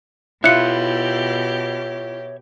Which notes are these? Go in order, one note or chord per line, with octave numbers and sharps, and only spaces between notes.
B2 E4 F4 G4 C#5 E5 F#6 C#7